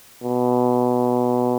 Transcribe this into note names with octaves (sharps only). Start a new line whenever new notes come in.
B2